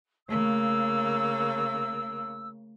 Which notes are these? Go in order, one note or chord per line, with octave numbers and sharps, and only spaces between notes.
C#3 A3 A#3 E6